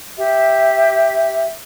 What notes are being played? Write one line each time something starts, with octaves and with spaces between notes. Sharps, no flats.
G4 E5